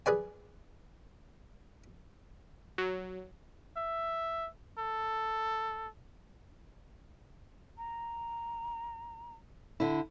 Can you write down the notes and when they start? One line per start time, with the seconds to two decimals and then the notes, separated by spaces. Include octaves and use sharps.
0.06 G#4 B4 D5 G#5
2.78 F#3
3.77 E5
4.79 A4
7.78 A#5
9.80 D3 E4